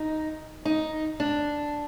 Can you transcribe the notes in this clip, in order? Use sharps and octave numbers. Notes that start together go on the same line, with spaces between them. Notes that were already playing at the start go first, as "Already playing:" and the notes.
Already playing: D#4
D#4
D4